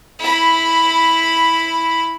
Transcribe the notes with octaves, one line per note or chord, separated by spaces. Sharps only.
E4 B5